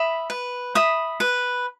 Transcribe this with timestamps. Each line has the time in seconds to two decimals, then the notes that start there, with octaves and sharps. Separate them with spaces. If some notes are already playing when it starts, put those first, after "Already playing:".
Already playing: E5 B5 D#6
0.30 B4
0.75 E5 B5 D#6
1.20 B4